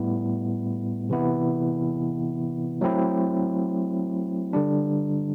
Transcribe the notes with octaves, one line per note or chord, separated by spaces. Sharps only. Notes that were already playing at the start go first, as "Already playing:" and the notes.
Already playing: A2 G3 B3 E4
C3 E3 B3 E4
F#3 A3 C4 E4
D3 G3 D4